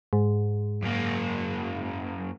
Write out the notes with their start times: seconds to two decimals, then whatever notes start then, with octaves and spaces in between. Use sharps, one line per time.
0.13 G#2
0.83 F#2 A#3